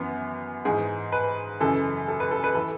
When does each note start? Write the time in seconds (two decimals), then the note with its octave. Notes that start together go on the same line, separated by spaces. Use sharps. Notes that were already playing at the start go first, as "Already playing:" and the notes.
Already playing: F#2 E3 B3
0.65 G#2 E3 G#4
1.12 B4
1.60 F#2 C#3 E3 A4
2.08 A4
2.20 B4
2.31 A4
2.44 B4
2.55 E3 A4